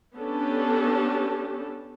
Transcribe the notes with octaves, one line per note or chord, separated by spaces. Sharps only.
B3 C#4 D4 G4 A4